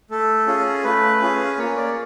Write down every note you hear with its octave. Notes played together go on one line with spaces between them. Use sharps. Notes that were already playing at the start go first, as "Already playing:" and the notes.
A3 A4
C#4 F4 G#4
A3 B4
C#4 F4 G#4
A#3 C#5
D5